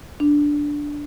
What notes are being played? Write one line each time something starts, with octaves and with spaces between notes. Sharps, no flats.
D4